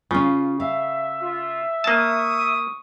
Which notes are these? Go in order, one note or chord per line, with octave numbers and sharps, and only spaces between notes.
C#3 C#4 F4
E5 F5
F4
A#3 A5 C#6 D#6